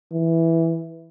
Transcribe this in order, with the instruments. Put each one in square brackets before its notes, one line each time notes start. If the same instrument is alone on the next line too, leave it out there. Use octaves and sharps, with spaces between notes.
[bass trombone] E3